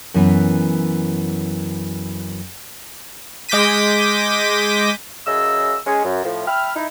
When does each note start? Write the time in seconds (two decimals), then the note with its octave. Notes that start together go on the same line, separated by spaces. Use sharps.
0.14 F#2 E3 B3
3.49 G#3 D6 G6 A#6 B6 D#7
5.27 F#2 C#3 D#5 E6
5.86 G#3 C#4 G#4
6.04 F#2
6.24 A2 F3
6.47 E5 G5 B5 F6
6.75 D#4 E4